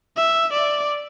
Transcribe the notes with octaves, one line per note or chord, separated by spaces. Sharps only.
E5
D5